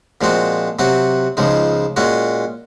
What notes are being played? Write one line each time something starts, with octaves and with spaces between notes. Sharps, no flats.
A#2 F3 G#3 C4 F#4
C3 F#3 C4 F#4
C#2 C#3 F3 G#3 D#4
A#2 G#3 C#4 F#4